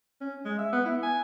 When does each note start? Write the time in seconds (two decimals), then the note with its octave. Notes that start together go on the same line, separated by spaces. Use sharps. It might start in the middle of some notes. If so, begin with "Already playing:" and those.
0.21 C#4
0.45 G#3
0.59 E5
0.73 B3
0.85 E4
1.03 G#5